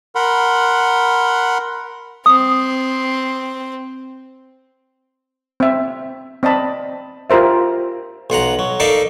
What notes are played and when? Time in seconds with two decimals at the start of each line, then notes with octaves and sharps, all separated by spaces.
0.15 A#4 F#5 B5 C6
2.26 C4 D#6
5.60 C4 E5
6.43 C4 D5 D#5 A5 B5
7.30 F4 G4 A#4 C5 E5
8.30 B1 F4 F#5 A#5
8.59 F#3
8.80 D#4 A4 A#4 D5 E5 F5